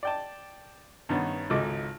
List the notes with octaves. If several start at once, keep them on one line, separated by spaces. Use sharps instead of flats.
D5 G5 A5
G2 D#3 B3 C#4
G#1 C#2 D#4 A4 D6